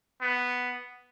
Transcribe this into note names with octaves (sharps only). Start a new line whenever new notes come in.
B3